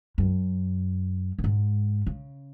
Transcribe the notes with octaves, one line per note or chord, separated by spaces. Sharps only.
F#2
F#2
G#2
C#3